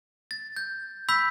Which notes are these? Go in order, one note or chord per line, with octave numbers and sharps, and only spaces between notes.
A6
G6
B5 E6 G6 B6